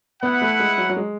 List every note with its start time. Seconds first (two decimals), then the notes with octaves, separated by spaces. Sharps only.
0.22 B3 E4 B4 F#5
0.42 A3
0.59 G#3
0.78 F#3
0.89 F#3
0.96 G#3